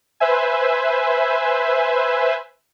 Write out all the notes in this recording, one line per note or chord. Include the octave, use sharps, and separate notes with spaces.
B4 C5 E5 G#5